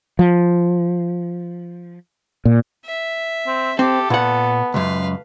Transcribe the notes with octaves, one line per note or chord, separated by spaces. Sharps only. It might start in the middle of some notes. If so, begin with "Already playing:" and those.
F3
A#2
E5
C4
C4 G4 A4
A#2 B3 F#5
C#2 F#2 B4 F5